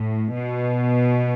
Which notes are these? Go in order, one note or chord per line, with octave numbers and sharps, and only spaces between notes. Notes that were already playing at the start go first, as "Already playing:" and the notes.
Already playing: A2
B2